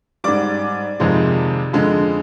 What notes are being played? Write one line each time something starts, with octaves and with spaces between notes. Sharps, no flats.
G#2 G3 D5 D6
F2 C3 D#3 G#3
F2 D3 G#3